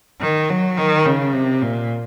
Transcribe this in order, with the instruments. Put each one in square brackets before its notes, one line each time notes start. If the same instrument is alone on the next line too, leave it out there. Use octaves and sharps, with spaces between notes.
[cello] D#3
F#3
D#3
C#3
C3
A#2